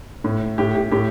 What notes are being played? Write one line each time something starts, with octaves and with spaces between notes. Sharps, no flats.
A2
A2 G4
G4
A2 G4